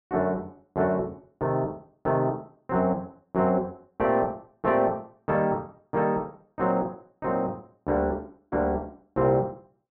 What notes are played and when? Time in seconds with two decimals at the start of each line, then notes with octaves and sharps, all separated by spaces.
0.11 F#2 D3 A3 D4 F#4
0.76 F#2 D3 A3 D4 F#4
1.41 C3 D#3 A3
2.05 C3 D#3 A3
2.69 F#2 F#3 C4
3.35 F#2 F#3 C4
4.00 A#2 A3 C4 G4 D5
4.64 A#2 A3 C4 G4 D5
5.28 D#3 G3 A#3 D#4 A4
5.93 D#3 G3 A#3 D#4 A4
6.58 A#2 F#3 C4 D#4
7.22 A#2 F#3 C4 D#4
7.87 D2 D3 G3 A#3 F#4
8.52 D2 D3 G3 A#3 F#4
9.16 C2 A#2 G3 C4